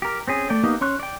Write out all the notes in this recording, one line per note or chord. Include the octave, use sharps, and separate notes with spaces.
G4 A#4
C4 C#4 G#4
A3 D5 G5
A#3 B3 D#4 G4
C#4 C6 C#6 F#6
D5 G5